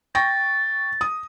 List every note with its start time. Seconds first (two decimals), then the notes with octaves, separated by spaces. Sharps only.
0.15 G5 C#6 A6 A#6
1.01 D#6